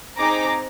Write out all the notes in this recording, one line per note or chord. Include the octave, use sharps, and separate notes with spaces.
C4 D#4 G#4 A#5 D6